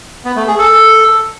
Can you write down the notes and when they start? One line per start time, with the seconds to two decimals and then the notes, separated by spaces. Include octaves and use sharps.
0.25 B3
0.36 A3
0.47 G#4
0.59 A4